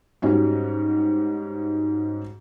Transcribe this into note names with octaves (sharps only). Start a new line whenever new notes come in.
G#2 G3 C#4 F#4